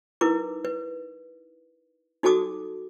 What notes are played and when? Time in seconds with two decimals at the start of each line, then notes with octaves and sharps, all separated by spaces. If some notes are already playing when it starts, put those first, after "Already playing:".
0.21 D#4 E4 A#4 B4 D6
0.65 B4
2.23 D#4 F#4 A4 A5 D6 D#6